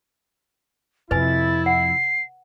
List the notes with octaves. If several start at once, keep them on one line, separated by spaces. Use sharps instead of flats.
F2 C3 E4 B4 G#5 A6
F#5 C7